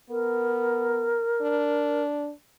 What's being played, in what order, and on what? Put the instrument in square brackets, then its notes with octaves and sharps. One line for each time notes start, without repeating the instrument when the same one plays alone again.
[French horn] B3 [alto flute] A#4
[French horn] D4